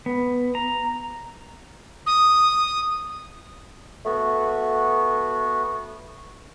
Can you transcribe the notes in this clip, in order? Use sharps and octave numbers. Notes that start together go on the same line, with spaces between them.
B3
A#5
D#6
A3 B3 F#4